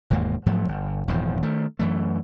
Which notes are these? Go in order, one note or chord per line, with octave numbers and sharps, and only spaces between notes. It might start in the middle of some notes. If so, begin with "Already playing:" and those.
E1 D#2 G#2 A#3
G#2 F3 F#3 A3
G1
D#1 E2 G#2 F3
D#3 A3
F#2 E3 A3